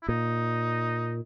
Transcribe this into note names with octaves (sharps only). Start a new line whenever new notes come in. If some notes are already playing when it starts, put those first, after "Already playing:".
E4
A#2 D#4